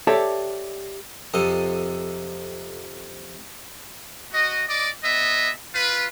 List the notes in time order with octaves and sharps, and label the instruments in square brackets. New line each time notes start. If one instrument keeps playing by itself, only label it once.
[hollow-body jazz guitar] G4 A4 C#5 D5 E5 A5
[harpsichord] F2 C3 A4 D#5
[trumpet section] F#4 D#5
D5 D#5 D6
B3 D#5 E5
F4 B4